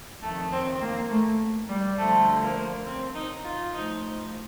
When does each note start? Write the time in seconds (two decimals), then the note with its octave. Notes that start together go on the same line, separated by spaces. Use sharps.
0.22 F2 D#3 A3
0.52 C4
0.81 A#3
1.10 A3
1.68 G3
1.98 D2 D3 F3 A3
2.42 A#3
2.86 C4
3.15 D#4
3.44 F4
3.74 A2 F3 D#4